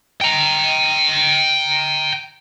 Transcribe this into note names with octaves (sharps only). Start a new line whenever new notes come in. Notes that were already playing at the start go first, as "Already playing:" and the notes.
G5 A#5